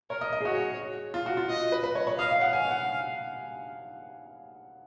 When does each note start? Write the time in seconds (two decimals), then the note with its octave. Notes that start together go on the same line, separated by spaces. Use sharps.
0.10 A#4 C#5
0.21 D#5
0.33 D#5
0.41 G#4
0.45 F#4 C#5
1.14 F4
1.26 F#4
1.37 F4
1.49 D#5
1.72 B4
1.84 B4
1.95 C#5
2.07 C#5
2.19 D#5 F5
2.30 F5
2.41 F#5
2.53 F5 G#5
2.71 F#5